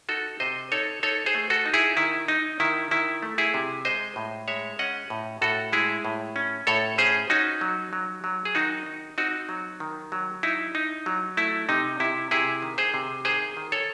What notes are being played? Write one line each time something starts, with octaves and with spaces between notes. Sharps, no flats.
D#4 F#4 A4
C3 C5 D#5
D#4 A4 C#5
D#4 A4 C#5
G#4 C5
A3
F#4 A4
D#4
E4 G#4
D#3 E4
D#4
D#3 E4
D#3 E4
A3
E4 G#4
C3
G#3 C5 D#5
A2
G#3 C#5 E5
C#4 D#5 F#5
A2
A2 F#4 A4
G#3 E4 G#4
A2
C#4
A2 A4 C#5
C#4 G#4 C5
C#4 D#4 F#4
F#3
F#3
F#3
G#4
D#3 D#4 F#4
D#4
C4 D#4 F#4
F#3
D#3
F#3
D#4 E4
D#4
F#3
A3 E4
C3 D#4
C3 E4
C3 E4 G#4
D#3
G#4 C5
C3
D#3 G#4 C5
D#3
A4 C#5